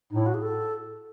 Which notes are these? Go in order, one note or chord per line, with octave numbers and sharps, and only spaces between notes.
A2 D#4
E4
F#4
G#4
A4